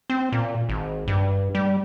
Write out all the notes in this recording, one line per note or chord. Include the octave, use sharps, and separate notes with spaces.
C4
A#2
G#1
G2
G3